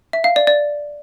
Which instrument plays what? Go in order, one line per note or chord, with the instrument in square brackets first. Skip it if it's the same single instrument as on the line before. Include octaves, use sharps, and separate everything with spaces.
[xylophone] E5
F5
D5
D5